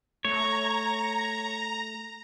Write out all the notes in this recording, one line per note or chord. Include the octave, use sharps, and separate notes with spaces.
A3 C#5 A#5